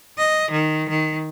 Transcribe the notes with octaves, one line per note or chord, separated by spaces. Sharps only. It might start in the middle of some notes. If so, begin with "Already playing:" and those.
D#5
D#3
D#3